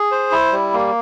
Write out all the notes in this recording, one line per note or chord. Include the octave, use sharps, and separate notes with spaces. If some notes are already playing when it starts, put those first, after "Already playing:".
Already playing: G#4
C5
E4
G3
A#3